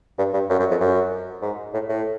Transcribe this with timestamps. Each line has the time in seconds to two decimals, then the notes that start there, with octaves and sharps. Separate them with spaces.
0.18 G2
0.34 G2
0.49 F#2
0.60 F#2
0.71 F2
0.81 F#2
1.42 G#2
1.74 A2
1.89 A2